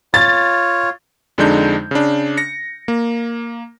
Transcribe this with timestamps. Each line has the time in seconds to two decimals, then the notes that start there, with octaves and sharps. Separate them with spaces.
0.14 F4 C#5 A6
1.38 F2 D3 G#3 D4 D#4 G6
1.91 C#3 D4
2.37 A#6 C#7
2.88 A#3